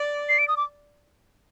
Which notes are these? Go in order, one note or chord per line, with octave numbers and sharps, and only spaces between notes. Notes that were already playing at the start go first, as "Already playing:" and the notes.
Already playing: D5
C7
D7
D#6
D6